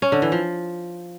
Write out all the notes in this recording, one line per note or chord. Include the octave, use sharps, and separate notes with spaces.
C#4
D3
E3
F3